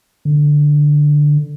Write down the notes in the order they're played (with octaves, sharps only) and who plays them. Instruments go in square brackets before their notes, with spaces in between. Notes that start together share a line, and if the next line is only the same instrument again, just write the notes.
[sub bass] D3